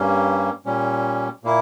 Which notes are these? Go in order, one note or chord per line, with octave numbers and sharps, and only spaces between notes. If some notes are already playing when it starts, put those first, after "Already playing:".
Already playing: G2 G3 A#3 C#4
A#2 G3 C#4
A#2 A#3 E4